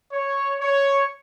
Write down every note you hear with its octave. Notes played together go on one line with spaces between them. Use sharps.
C#5
C#5